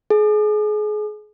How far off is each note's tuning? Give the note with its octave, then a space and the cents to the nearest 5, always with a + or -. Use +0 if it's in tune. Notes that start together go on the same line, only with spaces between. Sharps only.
G#4 +30